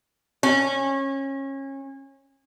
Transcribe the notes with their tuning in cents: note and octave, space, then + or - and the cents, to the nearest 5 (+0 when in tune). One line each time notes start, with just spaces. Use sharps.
C#4 -25